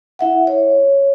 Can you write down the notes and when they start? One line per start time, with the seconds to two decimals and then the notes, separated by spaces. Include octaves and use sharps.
0.19 E4 E5 F#5
0.47 C#5